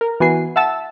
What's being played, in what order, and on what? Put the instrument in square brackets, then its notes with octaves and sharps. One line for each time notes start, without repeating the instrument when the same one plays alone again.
[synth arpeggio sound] A#4
E3 B3 F#4 G#5 C7
E5 F#5 A5 E6